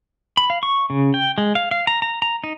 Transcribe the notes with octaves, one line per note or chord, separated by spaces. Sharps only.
B5
F5
C#6
C#3
G5
G#3
F5
F5
A#5
A#5
A#5
D#4